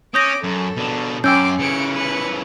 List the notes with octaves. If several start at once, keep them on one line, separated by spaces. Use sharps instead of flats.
C#4 D6 D#6 G6 A#6
F#2 A4
B2 D4
F#2 C#4 G5 C6 D6 E6 G6
C#3 E3 C#7 D7
B4 C#7